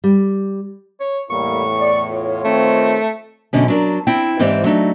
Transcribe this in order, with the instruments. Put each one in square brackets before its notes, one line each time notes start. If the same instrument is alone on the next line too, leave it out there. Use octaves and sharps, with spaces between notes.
[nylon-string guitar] G3
[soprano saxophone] C#5
[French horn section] E2 A2 [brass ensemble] G3 A#3 E4 [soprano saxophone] C#6
[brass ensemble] D5
F4 C#5
[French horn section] D#3 C4 [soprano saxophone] A3
[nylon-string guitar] F#2 B2 D3 C#4
F#3 D4 A#4
C4 E4 G5
G#2 E3 C4 G4 D5
F#3 A3 D4 D#4